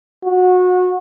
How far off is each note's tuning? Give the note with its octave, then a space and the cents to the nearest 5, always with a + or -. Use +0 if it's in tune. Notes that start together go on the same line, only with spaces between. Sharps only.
F#4 -25